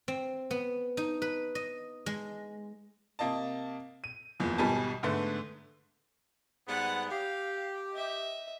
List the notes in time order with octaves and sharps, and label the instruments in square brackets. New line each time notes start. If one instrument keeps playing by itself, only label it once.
[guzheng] C4
B3
D#4
B4
D#5
G#3
[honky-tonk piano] C3 A#3 D#5 A5
D#7
F#1 E2 F3
G#1 B2 G3 G#5 A5
G#2 D3 A3 B3
[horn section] G#2 G3 B3 [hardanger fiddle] F#5
[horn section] G4 [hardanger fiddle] F5
[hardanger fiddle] D#5 E5